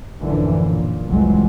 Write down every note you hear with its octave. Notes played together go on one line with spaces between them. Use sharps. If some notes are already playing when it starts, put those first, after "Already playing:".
A1 F#2 D3 E3 F3
A#2
F1 C2 F2 E3 F#3 G#3